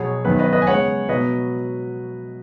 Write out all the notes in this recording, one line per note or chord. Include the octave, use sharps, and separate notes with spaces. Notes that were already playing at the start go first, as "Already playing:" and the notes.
Already playing: B2 F#3 B3 G#4 C#5
F#2 D#3 B3 B4
B4 D#5
B4 D#5
G#5
C#3 G#3 B3 C#5 F#5
B2 F#3 B3 B4 D#5